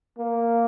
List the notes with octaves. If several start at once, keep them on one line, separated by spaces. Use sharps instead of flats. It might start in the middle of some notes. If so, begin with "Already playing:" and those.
A#3